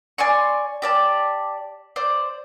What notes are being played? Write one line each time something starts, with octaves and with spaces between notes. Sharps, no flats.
D5 G#5 C6 C#6
G4 D5 A5
C5 D5